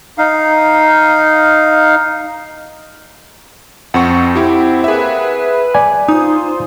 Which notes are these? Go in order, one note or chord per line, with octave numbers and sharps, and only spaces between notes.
D#4 F5
F2 C4 F#5 C#6
C4 E4 G4
A#3 G#4 B4 E5
B4
D5 G#5
D#4 F4 C5 D#6